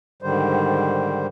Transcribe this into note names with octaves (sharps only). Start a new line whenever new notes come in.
G#2 D3 D#3 G3 C5